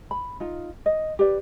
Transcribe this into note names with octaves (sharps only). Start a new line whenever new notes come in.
B5
D#4 F4
D#5
G4 B4 D5